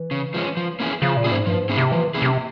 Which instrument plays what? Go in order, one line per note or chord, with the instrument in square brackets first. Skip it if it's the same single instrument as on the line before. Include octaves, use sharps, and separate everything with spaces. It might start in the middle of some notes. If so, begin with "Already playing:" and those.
Already playing: [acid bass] E3
[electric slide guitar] C#3
F3 G#3 C#4
F3
A#3 C#4 E4 G#4
[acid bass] C#3 [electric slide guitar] F3
[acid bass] A#2
[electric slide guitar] A#3 C#4 E4 G#4
[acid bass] G#2
[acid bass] G2 [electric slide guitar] F3
[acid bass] G#2
[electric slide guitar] A#3 C#4 E4 G#4
[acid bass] C3
[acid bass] E3 [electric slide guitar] F3
[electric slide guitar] A#3 C#4 E4 G#4
[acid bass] C3